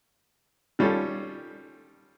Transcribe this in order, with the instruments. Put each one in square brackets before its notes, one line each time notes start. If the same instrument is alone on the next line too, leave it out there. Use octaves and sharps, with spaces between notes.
[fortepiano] D#3 G3 C#4 F4 A4